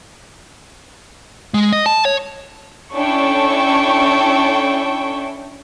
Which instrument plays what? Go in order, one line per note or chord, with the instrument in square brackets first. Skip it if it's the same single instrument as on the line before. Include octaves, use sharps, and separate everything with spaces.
[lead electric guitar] G#3
D#5
A5
C#5
[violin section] C#4 D4 E4 A4 G5 C#6